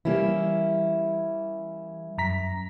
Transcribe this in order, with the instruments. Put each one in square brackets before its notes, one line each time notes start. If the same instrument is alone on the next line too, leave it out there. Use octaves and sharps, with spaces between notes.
[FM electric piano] E3 G3 [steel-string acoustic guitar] A#3 C#4 E4
[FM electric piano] F#2 A#5 B6